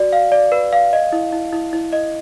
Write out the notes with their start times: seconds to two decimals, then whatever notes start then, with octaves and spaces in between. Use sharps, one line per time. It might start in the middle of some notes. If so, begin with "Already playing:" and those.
Already playing: F#4 D5
0.13 F5
0.32 D5
0.52 B4
0.73 F5
0.93 D#5
1.12 E4
1.33 E4
1.53 E4
1.73 E4
1.93 D#5